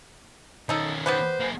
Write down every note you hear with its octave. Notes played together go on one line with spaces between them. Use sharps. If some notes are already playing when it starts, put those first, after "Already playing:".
D#3 C#4 D#4 A4
B3 G4 B4 C5
A#3 G#4